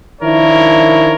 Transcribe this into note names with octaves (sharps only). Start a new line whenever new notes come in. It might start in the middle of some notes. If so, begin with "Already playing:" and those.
D#3 F3 D4 E4 A#4 C#5